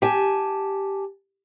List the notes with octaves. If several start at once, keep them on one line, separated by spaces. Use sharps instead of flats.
G4 G#5 A5